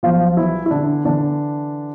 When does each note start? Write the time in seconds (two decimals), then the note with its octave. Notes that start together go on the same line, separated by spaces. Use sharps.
0.03 B1 F3 F4
0.26 F4
0.37 E3 E4
0.66 E4
0.70 D3 E3 D4
1.04 D3 E3 D4